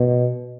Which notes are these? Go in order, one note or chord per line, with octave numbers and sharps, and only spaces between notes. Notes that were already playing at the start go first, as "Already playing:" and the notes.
Already playing: B2